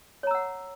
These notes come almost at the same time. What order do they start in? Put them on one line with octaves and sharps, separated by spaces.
C#5 A#5 E6 F#5